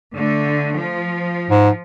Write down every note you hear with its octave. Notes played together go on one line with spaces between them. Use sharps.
D3 A3
F3
G#2